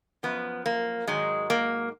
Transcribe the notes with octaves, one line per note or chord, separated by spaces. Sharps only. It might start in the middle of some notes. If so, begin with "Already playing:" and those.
F#2 F3 B3
A#3
G#2 D#3 F#3 G#3
A#3